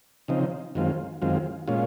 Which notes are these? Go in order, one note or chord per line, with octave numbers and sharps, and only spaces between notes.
C#3 F3 C4 D#4
F#2 D#3 G#3 C4 F4
F#2 D#3 G#3 C4 F4
A#2 G#3 C#4 F4